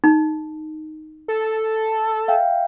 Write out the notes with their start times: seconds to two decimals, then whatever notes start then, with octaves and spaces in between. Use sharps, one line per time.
0.04 D#4
1.28 A4
2.28 E5 F5 G5